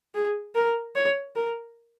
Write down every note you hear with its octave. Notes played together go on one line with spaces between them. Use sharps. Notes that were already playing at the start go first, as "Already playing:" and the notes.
G#4
A#4
C#5
A#4